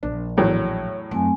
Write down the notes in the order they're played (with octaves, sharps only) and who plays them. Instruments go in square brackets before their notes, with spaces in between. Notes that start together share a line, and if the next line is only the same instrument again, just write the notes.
[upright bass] A#1 [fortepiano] D4
[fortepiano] E2 A2 F#3 [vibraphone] C#5
[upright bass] F#2 [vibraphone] A3 C4 G#5